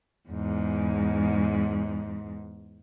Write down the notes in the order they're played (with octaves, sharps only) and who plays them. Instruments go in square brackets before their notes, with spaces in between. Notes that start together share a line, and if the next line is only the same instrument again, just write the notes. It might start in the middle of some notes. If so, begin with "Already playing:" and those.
[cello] E2 G#2